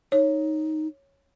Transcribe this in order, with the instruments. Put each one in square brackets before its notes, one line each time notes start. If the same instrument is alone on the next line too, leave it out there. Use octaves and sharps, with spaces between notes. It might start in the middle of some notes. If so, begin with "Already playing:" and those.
[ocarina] D#4 [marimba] C#5